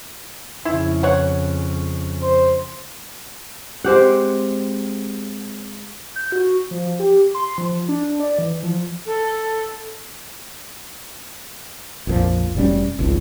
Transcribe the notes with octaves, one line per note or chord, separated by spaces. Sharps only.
F2 C#3 E4
C#5 F#5
C5
G#3 C4 G4 F#5
G6
F#4
F3
G4
C6
F3
D4
D5
E3
F3
A4
A#1 F2 A#2 F3
F1 B2 G3 C#4
G#1 C#2